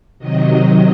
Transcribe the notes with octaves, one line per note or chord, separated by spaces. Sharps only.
C3 D#3 F#3 D#5